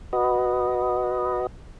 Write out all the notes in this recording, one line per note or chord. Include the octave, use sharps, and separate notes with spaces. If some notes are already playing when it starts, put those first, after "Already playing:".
F#4 B4 D#5